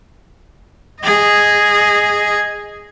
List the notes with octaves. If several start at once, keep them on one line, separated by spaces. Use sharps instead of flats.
G#4 D#5